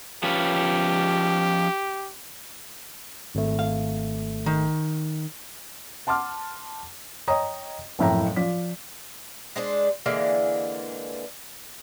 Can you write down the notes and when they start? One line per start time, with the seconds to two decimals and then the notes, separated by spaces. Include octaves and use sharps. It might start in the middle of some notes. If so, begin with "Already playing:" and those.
0.23 F3 C#4 G4 B4
3.35 G#1 A3
3.59 F5
4.46 D#3
6.07 F#5 A5 C6 D6 F6
7.28 C#5 D#5 G5 A#5 D#6
7.99 F#1 F2 A2 E5 G5 A#5
8.36 F3 D5 B6
9.56 G#3 D4 C5
10.06 D3 E3 G#3 A#3